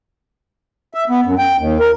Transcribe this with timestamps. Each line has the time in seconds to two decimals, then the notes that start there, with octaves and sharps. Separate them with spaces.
0.94 E5
1.10 B3
1.25 F#2
1.38 G5
1.58 D#2
1.80 A#4